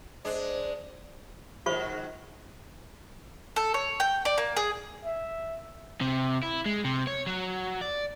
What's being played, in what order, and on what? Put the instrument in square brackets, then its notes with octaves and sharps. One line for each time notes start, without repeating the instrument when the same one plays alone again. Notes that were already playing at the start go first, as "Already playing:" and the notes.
[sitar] G#3 D4 [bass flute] C5
[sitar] G#2 D#3 F#3 [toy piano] F4 C5 C#6
[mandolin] A4
C#5
G5
D5
A#3
G#4
[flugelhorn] E5
[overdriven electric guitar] C3
E4
G#3
C3
C#5
F#3
D5